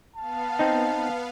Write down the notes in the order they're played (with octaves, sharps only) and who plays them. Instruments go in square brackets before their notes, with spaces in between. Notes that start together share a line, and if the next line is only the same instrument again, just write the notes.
[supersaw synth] B3 F5 [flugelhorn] A5
[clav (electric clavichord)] C4 D#4